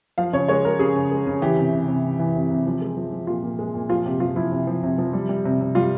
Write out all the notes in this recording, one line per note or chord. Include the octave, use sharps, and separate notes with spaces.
F3 F5
C#3 C#5
G#3 C#5
G#3 A#4
C#3 G#4
C#3
G#3
C#3
E3 G4
C3
C3
C3
E3
E3
C3
C3
F3
G#3
F3
F3
A#2 F4
A#2
G#3
A#2
F3 F4
C3 G4
F3 F4
F3 E4
C3
F3
C3
F3
G3
G3
C3
C3
G3 F4